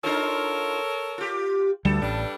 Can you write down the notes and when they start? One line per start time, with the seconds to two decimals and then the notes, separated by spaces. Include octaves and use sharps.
0.04 D4 D#4 F4 A4 A#4 C#5
1.18 F4 G4
1.85 D2 G2 G3 G#4 A4
2.02 A1 G3 D4